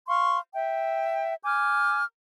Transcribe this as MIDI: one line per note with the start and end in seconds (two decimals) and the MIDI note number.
0.07 0.38 77
0.07 0.38 84
0.07 0.38 85
0.54 1.34 76
0.54 1.34 79
1.44 2.03 80
1.44 2.03 86
1.44 2.03 89
1.44 2.03 91